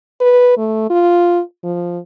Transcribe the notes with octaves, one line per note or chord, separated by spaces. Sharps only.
B4
A3
F4
F3